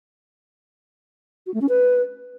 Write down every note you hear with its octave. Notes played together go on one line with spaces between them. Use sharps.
F#4
A3
C#4
B4